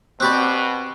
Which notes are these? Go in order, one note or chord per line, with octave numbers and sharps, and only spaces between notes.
B2 C4 G4 D5 B5 C#6 F#6